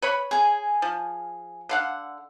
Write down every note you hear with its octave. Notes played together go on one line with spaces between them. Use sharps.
B4 C#5 B5
G#4 G#5
F3
D3 F5 F#5